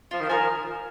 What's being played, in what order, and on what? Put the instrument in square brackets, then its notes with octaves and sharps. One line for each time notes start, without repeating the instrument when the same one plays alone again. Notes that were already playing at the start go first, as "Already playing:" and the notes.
[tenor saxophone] F3 [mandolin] F4
[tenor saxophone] D#3
[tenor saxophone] F3 [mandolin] A#4 F5 G#5